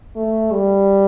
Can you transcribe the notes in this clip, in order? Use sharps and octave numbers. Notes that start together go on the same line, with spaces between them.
A3
G3